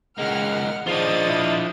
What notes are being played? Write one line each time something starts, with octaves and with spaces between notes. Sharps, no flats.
C#2 G#3 A#3 F#5 F6
G#2 F3 D4 F4 D#5 D#6 A6
E4